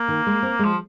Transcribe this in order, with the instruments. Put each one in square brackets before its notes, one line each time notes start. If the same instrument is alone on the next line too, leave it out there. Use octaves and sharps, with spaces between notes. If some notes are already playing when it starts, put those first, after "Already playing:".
Already playing: [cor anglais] A#3
[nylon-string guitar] D#3
G#3
C4
G#3
[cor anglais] F3